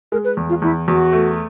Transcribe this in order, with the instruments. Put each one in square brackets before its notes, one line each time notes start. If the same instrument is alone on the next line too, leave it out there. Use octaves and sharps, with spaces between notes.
[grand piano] G#3 [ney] A#4
[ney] B4
[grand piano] E2
[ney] F4
[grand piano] E2 [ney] E4
[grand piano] E2 [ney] F#4
[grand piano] A3